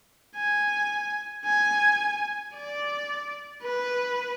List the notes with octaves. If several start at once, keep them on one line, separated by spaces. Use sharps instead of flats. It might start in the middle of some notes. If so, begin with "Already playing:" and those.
G#5
G#5
D5
B4